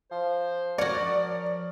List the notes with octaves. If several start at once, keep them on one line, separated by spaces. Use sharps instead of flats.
F3 C5
F#4 A#4 C#5 D5
F3